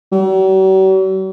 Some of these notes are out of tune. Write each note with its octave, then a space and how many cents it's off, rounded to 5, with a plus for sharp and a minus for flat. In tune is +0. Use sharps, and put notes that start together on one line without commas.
F#3 +45